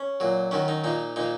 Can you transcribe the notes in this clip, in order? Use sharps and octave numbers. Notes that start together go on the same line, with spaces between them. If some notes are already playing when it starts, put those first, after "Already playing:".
Already playing: C#4
A#2 F#3
F#2 D#3 F#3 C#4
D#4
A#2 F3 D#4
A#2 F3 D#4